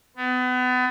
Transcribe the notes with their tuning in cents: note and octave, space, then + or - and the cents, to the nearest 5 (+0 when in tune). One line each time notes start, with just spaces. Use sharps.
B3 +30